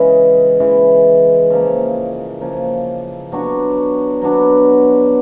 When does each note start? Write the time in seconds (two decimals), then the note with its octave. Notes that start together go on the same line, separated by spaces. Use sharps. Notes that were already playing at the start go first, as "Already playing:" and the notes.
Already playing: C#3 E3 G#3
0.60 C#3 E3 G#3
1.50 C#3 F3 A#3
2.41 C#3 F3 A#3
3.32 F#3 B3 D4 F#4
4.22 F#3 B3 D4 F#4